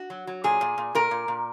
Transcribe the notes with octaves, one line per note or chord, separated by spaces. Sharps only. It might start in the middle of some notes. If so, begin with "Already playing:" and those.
Already playing: F#4
F#3
F#3
A#2 G#4
A#2
A#2
A#2 A#4
A#2
A#2